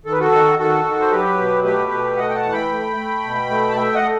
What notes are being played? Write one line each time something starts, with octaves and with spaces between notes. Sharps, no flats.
D#3 A4
B4
F#4 A4
D#3
D#3 F#4 A4
D#3
C5
F#3 G4 B4
B2
A3 G4 B4
B2
A3 D#5 F#5
G5
F#5 A5
E3
G5 B5
A3
A3
B2
A3
A5
A3 E5 G5
D#5 F#5
A3